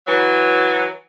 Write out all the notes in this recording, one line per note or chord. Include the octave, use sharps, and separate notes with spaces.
E3 F#3